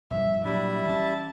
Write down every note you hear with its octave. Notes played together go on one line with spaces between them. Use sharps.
E1 G2 F3 E5
A#2 F#3 G3 D4 E4 E5
E3 C#4 A5